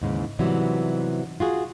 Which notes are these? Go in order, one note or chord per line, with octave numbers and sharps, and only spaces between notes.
D#2 G#2 C#3 E3
G#2 C3 E3 F#3 G3 B3
F4 F#4 G#4